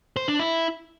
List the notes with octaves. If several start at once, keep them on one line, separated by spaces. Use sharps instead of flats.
C5
D4
E4